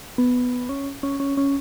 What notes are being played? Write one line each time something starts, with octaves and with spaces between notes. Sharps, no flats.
B3
C#4
C#4
C#4
C#4